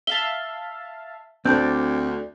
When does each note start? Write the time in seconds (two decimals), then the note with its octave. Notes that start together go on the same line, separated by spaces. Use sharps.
0.07 E5 F5 A5 G7
1.45 D2 C4 D4 D5 G6